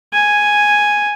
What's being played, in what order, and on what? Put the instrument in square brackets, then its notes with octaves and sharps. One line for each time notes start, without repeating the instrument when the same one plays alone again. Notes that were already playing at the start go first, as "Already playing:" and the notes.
[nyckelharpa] G#5